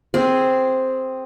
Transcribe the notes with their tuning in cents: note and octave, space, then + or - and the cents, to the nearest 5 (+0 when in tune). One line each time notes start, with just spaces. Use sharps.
C4 +0 G#4 +0